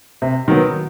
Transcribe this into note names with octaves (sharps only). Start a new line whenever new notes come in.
C3
D#3 F#3 B3